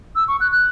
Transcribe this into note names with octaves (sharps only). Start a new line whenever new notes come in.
E6
C#6
F#6
F#6